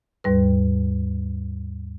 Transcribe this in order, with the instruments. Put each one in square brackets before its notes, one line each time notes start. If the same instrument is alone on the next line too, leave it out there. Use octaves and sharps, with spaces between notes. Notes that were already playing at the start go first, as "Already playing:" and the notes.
[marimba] D#2 G#2 G3 B4